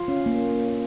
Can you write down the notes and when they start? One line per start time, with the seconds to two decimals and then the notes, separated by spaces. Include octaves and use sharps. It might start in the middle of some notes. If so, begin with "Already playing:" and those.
Already playing: F4
0.08 C#4
0.26 A#3